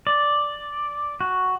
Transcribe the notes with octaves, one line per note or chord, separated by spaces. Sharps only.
D5
F#4